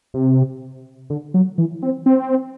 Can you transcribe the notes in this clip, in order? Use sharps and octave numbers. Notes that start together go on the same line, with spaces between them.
C3
D3
F#3
E3
C4
C4